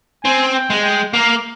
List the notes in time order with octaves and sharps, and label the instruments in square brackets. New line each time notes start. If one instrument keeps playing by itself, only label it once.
[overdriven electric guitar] C4 [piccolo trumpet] G#5
[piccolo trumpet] G5
[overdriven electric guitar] G#3
[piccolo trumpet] G5
[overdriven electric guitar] A#3 [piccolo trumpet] F5